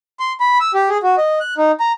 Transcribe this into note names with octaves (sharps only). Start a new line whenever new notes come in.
C6
B5
E6
G4
G#4
F#4
D#5
F#6
D#4
A#5